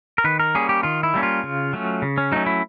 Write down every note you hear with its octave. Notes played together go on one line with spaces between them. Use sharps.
A#4
D#3 B4
A#4
G3 A#3 C#4 G#4
G4
D#3 F4
E4
G3 A#3 C#4
F4
C#3
F#3 A3 C#4
C#3
C#4
F#3 A3 C#4 D#4
E4